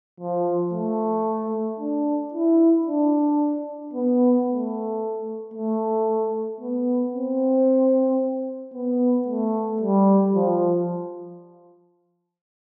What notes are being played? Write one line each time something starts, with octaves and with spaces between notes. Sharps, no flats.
F3
A3
D4
E4
D4
B3
A3
A3
B3
C4
B3
A3
G3
F3